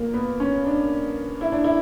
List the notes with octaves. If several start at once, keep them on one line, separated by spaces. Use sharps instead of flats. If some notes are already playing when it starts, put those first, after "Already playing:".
Already playing: A#2 A#3
B3
C#4
D4
E4
D4
E4